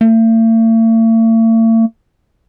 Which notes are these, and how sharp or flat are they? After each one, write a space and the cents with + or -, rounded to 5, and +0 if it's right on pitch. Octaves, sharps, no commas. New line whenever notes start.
A3 +45